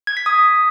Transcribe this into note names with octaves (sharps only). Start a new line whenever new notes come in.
G#6
B6
D#6